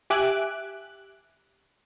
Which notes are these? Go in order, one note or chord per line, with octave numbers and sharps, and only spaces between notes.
G4 E5 G#5 D6 F#6